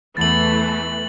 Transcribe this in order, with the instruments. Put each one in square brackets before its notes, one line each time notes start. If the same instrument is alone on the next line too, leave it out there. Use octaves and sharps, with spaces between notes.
[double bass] E2 B3 [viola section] E3 A3 [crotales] A6 F#7